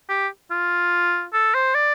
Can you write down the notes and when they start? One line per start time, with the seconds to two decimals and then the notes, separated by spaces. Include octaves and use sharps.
0.09 G4
0.51 F4
1.34 A4
1.55 C5
1.75 D5